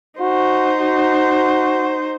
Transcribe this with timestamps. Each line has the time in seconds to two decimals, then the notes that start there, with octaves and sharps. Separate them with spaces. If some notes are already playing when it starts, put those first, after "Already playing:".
0.20 D#4 F#4 C5
0.80 F#4